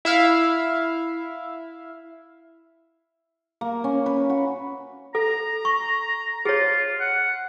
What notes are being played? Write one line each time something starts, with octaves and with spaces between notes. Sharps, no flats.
E4 E5 F5
A#3
C#4
B4
F#4
A4 A#5
C#6
F4 G#4 C#5
F#5